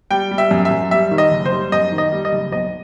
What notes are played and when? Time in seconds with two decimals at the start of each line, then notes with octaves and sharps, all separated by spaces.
0.11 G3 G5
0.31 G3
0.38 E5
0.51 F#2
0.65 E5
0.71 F#2
0.91 G3 E5
1.11 D#3
1.18 D#5
1.31 F#1
1.45 C5
1.52 G3
1.72 F#2 D#5
1.92 D#3
1.98 D#5
2.12 G3
2.25 D#5
2.33 F#1
2.52 B1 D#5